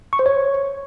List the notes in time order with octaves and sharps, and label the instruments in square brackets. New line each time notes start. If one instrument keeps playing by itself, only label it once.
[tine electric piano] C#6
C5
C#5